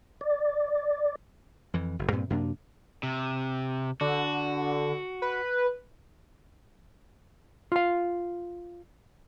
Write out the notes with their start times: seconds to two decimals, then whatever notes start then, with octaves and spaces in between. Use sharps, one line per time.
0.21 D5
1.74 F2 E3
1.99 F#1
2.12 G2 A#2 C4
2.30 F#2 C3 A#3 D4
3.03 C3
4.01 D3 F#4
5.22 B4
7.72 F4 F5